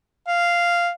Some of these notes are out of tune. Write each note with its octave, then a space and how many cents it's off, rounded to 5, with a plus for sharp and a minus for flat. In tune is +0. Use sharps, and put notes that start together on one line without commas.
F5 -5